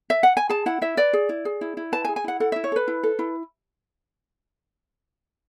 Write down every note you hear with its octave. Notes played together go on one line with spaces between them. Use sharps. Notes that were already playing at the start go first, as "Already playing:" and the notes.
E5
F#5
G#5
G#4 A5
E4 F#5
E4 E5
B4 D5
G#4
E4
G#4
E4
E4
B4 A5
G#5
G#4
G#5
E4 F#5
A4 F#5
E4 E5
C#5
A4 B4
E4
A4
E4